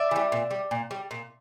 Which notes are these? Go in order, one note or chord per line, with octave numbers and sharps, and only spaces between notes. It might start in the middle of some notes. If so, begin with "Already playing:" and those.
Already playing: D5 E5
E3 G3
A#2
G3
A#2
G3
A#2